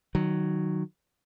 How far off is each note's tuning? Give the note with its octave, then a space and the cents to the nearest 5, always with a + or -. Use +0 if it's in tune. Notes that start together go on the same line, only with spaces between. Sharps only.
D#3 -15 F#3 +0